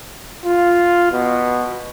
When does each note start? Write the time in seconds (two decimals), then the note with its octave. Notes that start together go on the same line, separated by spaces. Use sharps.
0.45 F4
1.11 B2